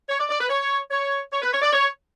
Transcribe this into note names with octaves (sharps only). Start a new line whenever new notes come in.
C#5
D5
D5
B4
C#5
C#5
C#5
B4
C#5
D5
C#5